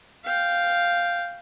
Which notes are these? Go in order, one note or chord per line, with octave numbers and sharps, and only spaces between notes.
F5 G5